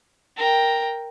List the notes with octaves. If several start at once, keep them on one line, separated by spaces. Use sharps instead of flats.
A#4 G5